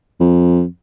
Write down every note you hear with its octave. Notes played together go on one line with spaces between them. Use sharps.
F2